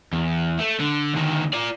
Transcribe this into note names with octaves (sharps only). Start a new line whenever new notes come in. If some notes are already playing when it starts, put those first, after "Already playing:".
E2
A3
D3
D2 D#3
F4 D5